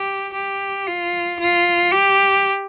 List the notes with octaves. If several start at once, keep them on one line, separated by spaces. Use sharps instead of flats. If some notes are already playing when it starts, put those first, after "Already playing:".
Already playing: G4
G4
F4
F4
G4